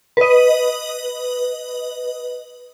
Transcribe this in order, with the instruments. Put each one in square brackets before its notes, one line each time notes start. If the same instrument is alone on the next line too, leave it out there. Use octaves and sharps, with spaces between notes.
[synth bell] B4 D#5